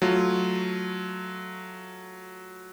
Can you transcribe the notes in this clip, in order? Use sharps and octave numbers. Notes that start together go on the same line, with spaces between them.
F#3 A3 F4